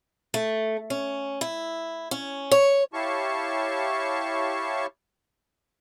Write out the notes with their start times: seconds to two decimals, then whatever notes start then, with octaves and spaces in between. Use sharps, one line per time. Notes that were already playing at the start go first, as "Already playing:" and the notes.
0.34 A3
0.90 C#4
1.41 E4
2.11 C#4
2.51 C#5
2.93 E4 G4 C#5 F5 A5 C#6